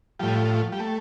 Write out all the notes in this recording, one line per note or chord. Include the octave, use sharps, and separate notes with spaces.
A2 F3 G3
G3
A3